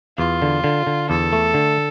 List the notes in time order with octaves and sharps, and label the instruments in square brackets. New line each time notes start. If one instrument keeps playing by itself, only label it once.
[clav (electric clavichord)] E2 [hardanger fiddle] F4
[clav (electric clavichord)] D3
D3
D3
[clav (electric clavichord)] E2 [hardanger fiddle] A4
[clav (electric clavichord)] A3
D3